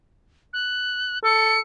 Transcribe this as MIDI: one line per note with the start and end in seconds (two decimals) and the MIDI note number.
0.53 1.19 90
1.24 1.56 69
1.24 1.60 97